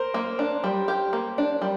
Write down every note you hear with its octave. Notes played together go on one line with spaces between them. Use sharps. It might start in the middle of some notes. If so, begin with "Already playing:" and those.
Already playing: A#4 C5
A#3
D4
G3
G4
A#3
D4
G3